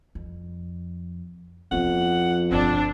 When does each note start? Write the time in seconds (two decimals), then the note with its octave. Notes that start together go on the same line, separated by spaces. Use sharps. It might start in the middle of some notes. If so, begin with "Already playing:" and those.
0.15 F2
1.72 F2 B3 E4 F#5
2.51 G1 B2 C4 D4